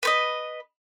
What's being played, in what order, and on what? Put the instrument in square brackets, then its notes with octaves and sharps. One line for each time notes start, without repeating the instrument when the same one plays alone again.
[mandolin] B4 C5 D#5